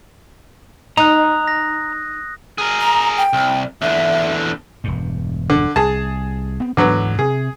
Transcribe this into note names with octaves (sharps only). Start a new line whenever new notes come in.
D#4 A#5 D#6 F#6
A#6
G#4 A#4
A#5
G5
C2
E2 D3 E5
E1 G2
D3
C2 G#4 A5
B3 C4
D2 G#2 D3 E3 F#3 B3
C3 G#4